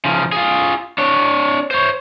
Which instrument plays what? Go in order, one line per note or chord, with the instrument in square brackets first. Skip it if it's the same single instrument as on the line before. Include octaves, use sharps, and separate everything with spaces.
[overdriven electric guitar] C#3 F3
F4 G#4
D4 C#5
C5 C#5